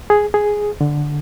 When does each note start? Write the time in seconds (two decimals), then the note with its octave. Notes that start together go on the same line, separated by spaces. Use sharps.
0.10 G#4
0.34 G#4
0.81 D3